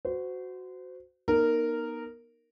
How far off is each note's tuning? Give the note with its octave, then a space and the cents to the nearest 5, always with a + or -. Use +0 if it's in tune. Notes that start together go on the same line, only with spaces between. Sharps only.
F#4 +0 C5 -30
B3 -35 D#4 -5 A#4 -10